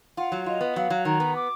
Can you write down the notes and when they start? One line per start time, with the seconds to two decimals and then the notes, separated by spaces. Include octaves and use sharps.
0.17 F4 F#5
0.32 F#3
0.46 F4 D#5
0.61 B3
0.76 F#3 F5
0.90 F#3
1.05 D#3 A#5
1.20 B3
1.35 D6